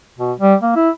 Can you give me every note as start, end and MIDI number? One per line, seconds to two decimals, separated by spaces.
0.18 0.32 47
0.40 0.55 55
0.62 0.74 58
0.76 0.90 64